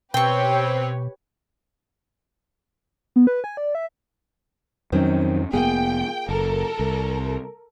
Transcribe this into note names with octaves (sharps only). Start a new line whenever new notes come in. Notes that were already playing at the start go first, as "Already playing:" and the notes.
B2 C4 G4 B4 C#5 G5 C#6
B3
B4
G#5
D5
E5
F2 D#3 F#3 C4 C#4
F1 A#3 B3 F4 G#4 G5
F#1 A4 A#4
C2